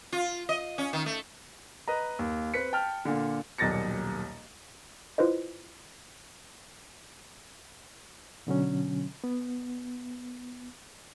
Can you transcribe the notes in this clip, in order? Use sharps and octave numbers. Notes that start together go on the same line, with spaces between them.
F4
D#5
C#4
D#3
A3
B4 D#5 A#5
D#2
C4 B4 B6 C#7
G5 A5 F6
A#2 D3
D#1 B1 A#2 A6 A#6 C#7
E4 F4 B4 C5 D#5
B2 D3 F#3 C#4
B3